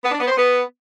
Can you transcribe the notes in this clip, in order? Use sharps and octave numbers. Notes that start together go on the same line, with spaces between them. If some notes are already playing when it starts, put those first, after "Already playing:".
B3
D4
B3
C5
B3